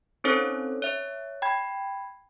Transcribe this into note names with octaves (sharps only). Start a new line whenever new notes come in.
C4 C#4 D#4 A4 C5 C#5
C#5 E5
G5 B5 G#6